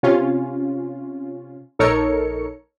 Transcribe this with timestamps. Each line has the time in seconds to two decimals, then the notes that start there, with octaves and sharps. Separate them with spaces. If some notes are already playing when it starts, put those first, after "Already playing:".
0.03 C3 C#4 F4
1.79 A#1 D#4 A4 A#4 C#5 C#7